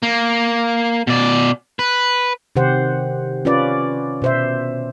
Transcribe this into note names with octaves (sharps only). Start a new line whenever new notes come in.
A#3
B2 D5
B4
C3 D#3 G4 C5 F#5
C#4 F4 B4 D5
B2 C5 E5